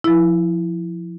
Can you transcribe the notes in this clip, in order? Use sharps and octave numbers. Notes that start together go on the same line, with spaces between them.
F3 E4